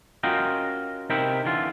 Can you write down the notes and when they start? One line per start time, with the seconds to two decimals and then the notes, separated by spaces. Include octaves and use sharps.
0.23 C#4 F4 F#4 A#4 D#5 G5
1.10 C3 C4 D#4 E4 A#4 G5
1.45 D3 E3 F4